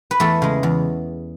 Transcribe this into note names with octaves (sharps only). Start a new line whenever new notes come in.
B4
E2 A3 A4
C#3 G#3
E2